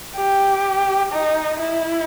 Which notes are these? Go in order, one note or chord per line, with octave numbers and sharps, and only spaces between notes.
G4
D#4
E4